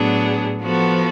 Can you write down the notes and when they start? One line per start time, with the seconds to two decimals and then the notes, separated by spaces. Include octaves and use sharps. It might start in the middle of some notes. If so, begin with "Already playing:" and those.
Already playing: A2 F#3 B3 D4 G#4
0.61 F3 B3 F#4 A4